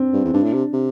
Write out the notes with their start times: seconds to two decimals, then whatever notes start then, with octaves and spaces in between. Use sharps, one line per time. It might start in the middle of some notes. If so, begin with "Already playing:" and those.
Already playing: C4 D4
0.14 G2
0.25 E2
0.33 G2 D4
0.44 A2
0.53 C3
0.73 C3